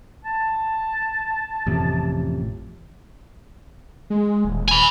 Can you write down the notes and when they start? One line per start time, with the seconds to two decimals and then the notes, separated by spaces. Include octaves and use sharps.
0.25 A5
1.67 A1 F2 C3
4.10 G#3
4.45 D#1
4.68 G#5 B5